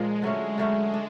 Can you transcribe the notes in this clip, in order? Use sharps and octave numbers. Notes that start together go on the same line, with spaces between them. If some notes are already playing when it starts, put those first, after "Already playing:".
Already playing: A#2 F3 G#3 A#3
D3 F#3 A3 C#4
D3 F#3 G#3 A3 C#4
D4